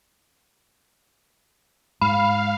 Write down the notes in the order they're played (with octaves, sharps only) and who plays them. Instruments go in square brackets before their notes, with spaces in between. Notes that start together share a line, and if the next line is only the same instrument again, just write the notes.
[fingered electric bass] G#2 [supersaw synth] F5 [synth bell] B5